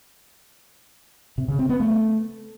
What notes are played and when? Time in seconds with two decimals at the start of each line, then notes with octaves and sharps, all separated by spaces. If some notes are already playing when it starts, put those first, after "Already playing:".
1.38 C3
1.48 C#3
1.59 C4
1.69 B3
1.80 A3